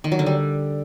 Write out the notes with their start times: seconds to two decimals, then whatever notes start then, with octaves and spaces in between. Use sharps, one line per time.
0.04 D#3
0.12 F#3
0.19 D3
0.26 G3